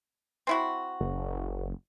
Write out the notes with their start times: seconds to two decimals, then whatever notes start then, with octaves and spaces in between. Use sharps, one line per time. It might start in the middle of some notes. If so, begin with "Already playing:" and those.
0.47 C4 E4 F#4
1.01 F#1